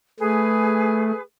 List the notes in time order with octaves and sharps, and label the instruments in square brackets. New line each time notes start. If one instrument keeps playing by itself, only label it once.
[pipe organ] A3 [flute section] G#4 B4